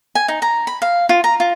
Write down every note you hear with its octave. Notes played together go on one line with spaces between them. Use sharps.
G#5
D#4
A#5
B5
F5
F4
A#5
F4